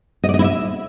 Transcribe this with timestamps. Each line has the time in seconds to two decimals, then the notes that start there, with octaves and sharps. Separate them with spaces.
0.24 D#5
0.29 D5
0.34 D#5
0.39 E4
0.44 E5